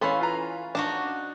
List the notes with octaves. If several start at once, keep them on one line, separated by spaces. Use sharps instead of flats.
E3 C#4 A4 C#5 F5 B5 C6
F4 B4 A#5
D4 D#4 F#4 A5